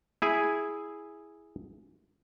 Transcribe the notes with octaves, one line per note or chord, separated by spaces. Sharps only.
E4 G#4 G#5